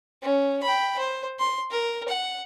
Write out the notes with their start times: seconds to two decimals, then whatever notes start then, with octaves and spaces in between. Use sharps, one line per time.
0.22 C#4
0.63 G5 B5
0.99 C5
1.39 C6
1.71 A#4
2.09 F#5